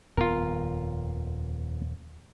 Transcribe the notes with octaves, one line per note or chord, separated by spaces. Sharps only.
D#1 F2 B3 F4 A#4